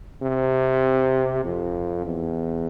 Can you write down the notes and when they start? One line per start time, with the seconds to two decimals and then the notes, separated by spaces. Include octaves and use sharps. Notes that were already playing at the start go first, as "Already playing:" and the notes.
0.22 C3
1.45 F2
2.05 E2